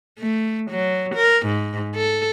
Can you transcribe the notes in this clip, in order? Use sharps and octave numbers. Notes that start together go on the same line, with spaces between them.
A3
F#3
A#4
G#2
A4